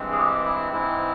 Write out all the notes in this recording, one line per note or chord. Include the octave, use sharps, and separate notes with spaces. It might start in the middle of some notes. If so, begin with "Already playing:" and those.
Already playing: G2 E3 G#3 C4
G#4
G4
E4
G#2 E3 G#3 C4 E4